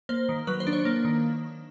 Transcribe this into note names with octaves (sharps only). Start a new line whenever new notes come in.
A#3 C5
D#3
F#3 B4
C5
D4
C#5
A#3
D#3